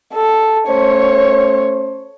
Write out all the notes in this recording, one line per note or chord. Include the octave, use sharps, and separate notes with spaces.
A4
A3 C#4 C5 C#5